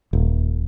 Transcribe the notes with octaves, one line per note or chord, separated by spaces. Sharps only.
D#1